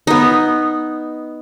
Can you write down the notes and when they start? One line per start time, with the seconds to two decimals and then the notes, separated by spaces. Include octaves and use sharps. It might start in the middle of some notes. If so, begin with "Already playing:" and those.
0.07 B3 D#4